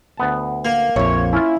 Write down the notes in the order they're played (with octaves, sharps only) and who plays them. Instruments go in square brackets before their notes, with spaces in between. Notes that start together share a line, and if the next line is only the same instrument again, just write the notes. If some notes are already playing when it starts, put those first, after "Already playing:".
[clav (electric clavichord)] D2 B3 A5
[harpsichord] A#3
[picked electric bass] A#1 F2 [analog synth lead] C#5 [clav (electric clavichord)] E5
[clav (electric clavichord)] C#4 F4 [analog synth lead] E4